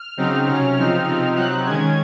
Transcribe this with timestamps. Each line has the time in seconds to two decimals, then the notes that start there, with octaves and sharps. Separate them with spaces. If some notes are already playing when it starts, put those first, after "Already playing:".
Already playing: F6
0.17 C#3 F#3 C4 D#4
0.48 C3 F#3 C#4
0.77 C#3 F3 C4 D#4 F6
1.07 C3 F3 C4 D#4
1.36 C3 F#3 C4 D#4 F#6
1.66 D#3 G#3 C#4 G#6